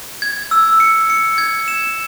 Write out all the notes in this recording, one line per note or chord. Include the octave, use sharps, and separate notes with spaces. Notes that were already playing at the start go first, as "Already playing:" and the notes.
G#6
E6
C#7
C#7
G#6
E7